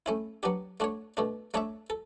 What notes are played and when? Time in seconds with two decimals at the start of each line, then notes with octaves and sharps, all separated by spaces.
0.06 A3 C#4 E4
0.43 F#3 B3 D4 G4
0.80 A3 D4 F#4 C#5
1.17 B2 A3 D4
1.54 A3 D4 A4 C#5 E5
1.90 A4